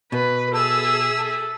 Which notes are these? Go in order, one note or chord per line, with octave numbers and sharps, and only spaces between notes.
B2 B4
G#4 A4 E5 E6
A4